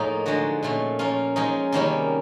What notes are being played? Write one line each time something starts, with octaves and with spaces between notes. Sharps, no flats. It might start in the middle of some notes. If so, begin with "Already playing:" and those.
Already playing: A2 F3 A#3 D#4 G#4
D3 F3 G#3 F#4
A#2 F3 A3 C#4
F3 A#3 C#4 F4
F3 G#3 C#4 D#4
C3 D#3 G3 A#3 C#4